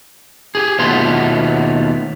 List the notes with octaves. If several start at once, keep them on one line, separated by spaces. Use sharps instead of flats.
G4 G#4
D#2 B2 A3 B3 F4 C6